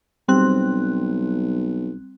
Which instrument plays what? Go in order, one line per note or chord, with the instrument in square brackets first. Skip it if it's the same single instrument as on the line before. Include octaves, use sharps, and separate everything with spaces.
[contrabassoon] B1 [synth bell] G3 C4 F#6